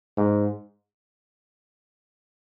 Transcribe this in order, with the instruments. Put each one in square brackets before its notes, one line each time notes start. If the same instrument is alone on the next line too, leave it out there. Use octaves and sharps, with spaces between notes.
[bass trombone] G#2